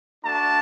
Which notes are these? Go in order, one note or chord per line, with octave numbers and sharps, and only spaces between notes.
A3 D4 F#4 A5